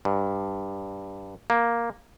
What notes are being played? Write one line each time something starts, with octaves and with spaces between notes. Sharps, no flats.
G2
A#3